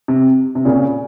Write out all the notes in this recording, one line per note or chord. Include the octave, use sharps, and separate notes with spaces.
C3
C3
A#2 C#3